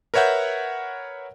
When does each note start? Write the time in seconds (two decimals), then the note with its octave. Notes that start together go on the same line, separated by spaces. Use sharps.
0.14 A#4 B4 C#5 E5 F#5 G6